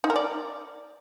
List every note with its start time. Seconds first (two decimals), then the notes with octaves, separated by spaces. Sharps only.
0.04 D#4
0.10 A#4
0.16 D5